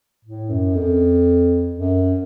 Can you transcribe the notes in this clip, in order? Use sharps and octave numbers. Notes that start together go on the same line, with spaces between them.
A2
F#2
F2
F#2